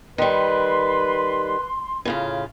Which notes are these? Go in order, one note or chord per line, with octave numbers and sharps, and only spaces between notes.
D#3 G3 B4 C6
A2 C#3 F4